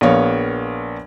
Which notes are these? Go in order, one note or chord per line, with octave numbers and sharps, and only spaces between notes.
A#1 A#3 B3 C#5 F5